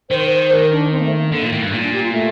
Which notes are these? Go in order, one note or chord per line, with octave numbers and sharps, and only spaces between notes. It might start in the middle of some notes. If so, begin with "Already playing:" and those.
D#3 C5
C5
A#4
D4
C4
A#3
A3
A#3
A3
D3 A#3
A#2 A#3
A2
G2
A#2 D#4
D4
G4
F4
A3